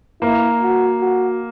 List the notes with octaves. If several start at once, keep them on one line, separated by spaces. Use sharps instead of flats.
A#3 E4
F#4
F#4